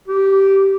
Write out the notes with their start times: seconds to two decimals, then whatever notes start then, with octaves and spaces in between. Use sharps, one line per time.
0.08 G4